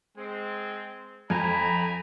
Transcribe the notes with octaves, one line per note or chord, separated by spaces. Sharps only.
G#3 C4
F2 G#5 A#5 B5